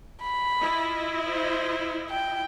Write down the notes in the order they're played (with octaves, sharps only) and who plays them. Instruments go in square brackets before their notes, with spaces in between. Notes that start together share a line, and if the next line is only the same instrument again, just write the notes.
[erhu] B5
[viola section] E4 F4 D#5
[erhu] C5
G5